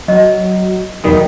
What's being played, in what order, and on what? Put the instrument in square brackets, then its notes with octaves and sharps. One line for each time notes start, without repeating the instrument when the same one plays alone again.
[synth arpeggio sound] F#3 [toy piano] D#5
[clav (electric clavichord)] B1 D#3 G3 [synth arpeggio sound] E2 D#6